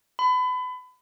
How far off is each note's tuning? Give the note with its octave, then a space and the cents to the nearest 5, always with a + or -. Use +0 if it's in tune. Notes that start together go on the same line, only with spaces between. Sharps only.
B5 +30